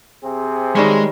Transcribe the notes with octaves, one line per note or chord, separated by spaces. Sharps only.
C3 C4 G#4
D#3 G3 G#3 C#5